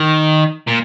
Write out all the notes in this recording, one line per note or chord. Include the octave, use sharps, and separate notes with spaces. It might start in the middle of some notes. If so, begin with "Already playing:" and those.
Already playing: D#3
A#2